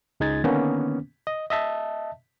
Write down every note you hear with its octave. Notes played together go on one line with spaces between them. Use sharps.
C#2 G#3 D#4 G#6 A6
D3 D#3 A#3 B3 C#4
D#5
D#5 E5 A5